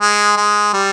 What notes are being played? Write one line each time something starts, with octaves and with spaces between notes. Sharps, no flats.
G#3
G#3
G3